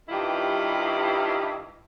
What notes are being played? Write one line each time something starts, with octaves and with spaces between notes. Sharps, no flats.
G2 D#3 E3 G3 E4 F4